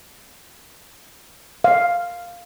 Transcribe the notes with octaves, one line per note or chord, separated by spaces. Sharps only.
F5